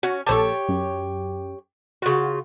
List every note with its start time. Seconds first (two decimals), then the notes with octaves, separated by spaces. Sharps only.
0.03 C#4 F#4
0.27 A#1 G4 A4 C5 C#5 A5
0.69 F#2
2.02 C#3 F4 F#4